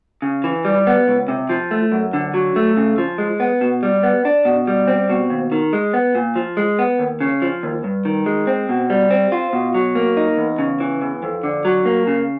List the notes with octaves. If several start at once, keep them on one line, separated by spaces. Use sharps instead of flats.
C#3
E3
G3
B3
C#2
C3
F3
A3
F#2
D3
F#3
A3
C#3
F3
G#3
B3
B2
G3
B3
D4
B2
G3
C4
B2
D#2
D#3
G#3
B3
A#2
F3
G#3
B3
D#2
C#3
F3
D#2
G2
D#3
G#3
C4
B2
G3
C4
F4
B2
F#3
A#3
D#4
E2
C#3
E3
E2
F2
D3
F#3
A#3
C#3